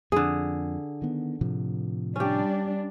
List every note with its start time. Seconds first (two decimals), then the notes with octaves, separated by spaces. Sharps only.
0.12 F2 D3 G#4
1.02 D#3 B3
1.41 A2 C3 F3
2.16 G3 C#4 D4 G4